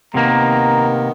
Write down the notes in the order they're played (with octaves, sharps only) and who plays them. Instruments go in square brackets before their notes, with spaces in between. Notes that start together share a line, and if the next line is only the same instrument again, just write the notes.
[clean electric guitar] C3 A#3 [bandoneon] D#3 B3 [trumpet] A#5